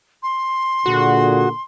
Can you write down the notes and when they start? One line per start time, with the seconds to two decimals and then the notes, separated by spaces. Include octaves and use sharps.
0.23 C6
0.86 A#2 D3 F#4 G#4